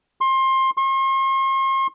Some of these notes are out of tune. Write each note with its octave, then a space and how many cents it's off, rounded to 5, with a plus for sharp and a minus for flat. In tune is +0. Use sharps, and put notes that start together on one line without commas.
C6 +25
C6 +45